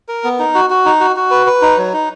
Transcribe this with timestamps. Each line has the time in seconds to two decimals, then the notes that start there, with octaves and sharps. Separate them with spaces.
0.08 A#4
0.24 B3
0.39 D#4
0.55 F#4
0.70 F#4
0.85 D#4
1.00 F#4
1.16 F#4
1.31 B4
1.46 B4
1.62 D#4
1.77 F#3
1.93 D#4